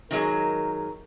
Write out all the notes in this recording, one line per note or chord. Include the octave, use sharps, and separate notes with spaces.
D#3 F#3 G#3 A#4